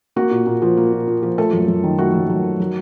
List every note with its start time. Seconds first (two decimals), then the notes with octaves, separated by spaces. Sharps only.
0.16 A#3 F#4
0.31 A#2
0.47 A#2
0.62 F3
0.77 A#3
0.92 A#2
1.07 A#2
1.23 F3
1.38 A3 A4
1.53 F#2
1.68 F#2
1.84 D#3
1.99 A3 F#4
2.14 F#2
2.30 F#2
2.44 D#3
2.60 F#3